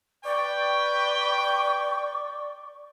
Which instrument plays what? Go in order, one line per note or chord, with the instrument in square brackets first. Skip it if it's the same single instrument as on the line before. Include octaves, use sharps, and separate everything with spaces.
[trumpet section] B4 G5 [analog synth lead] D5 [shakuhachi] C#6